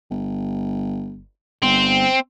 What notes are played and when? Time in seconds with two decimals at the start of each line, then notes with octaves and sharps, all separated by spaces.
0.11 G1
1.63 G1 C4